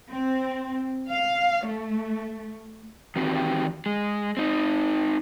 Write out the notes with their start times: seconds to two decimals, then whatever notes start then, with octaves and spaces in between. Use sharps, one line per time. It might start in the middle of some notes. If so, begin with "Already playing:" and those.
0.13 C4
1.10 F5
1.67 A3
3.16 D#3 E3 C4 F#4 G4
3.86 G#3
4.37 C4 D#4